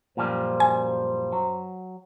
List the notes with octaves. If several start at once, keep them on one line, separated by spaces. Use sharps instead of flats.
F#2 A#2 F3 G3 C5
G#5
F#3